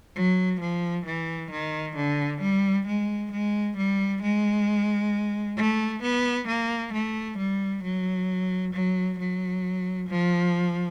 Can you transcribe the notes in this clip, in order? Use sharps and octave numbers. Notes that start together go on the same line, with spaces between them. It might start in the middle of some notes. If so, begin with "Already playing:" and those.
F#3
F3
E3
D#3
D3
G3
G#3
G#3
G3
G#3
A3
B3
A#3
A3
G3
F#3
F#3
F#3
F3